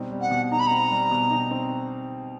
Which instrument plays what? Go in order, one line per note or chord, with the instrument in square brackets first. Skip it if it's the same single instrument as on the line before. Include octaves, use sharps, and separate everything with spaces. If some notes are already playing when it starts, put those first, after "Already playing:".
Already playing: [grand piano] B2 G3 C4 D#4
G3
[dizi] F#5
[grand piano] B2
[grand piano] D#4 [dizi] A#5
[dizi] B5
[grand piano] C4 [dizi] A#5
[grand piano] G3
B2
D#4
C4